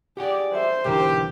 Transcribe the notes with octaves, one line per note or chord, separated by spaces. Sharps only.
G4 G#4 D5 F#5 G5
A4 C5 E5
B1 D3 E3 G4 A#4 A#5